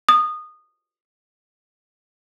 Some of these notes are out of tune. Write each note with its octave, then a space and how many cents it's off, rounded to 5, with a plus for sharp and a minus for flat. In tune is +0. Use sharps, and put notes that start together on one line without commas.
D#6 -20